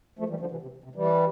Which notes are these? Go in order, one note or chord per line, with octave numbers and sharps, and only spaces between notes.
F3 A3
E3 G3
D3 F3
C3 E3
C3
C3
E3 G3